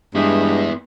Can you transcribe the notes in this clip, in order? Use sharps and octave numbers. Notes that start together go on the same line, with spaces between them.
G2 G#3 B3 E4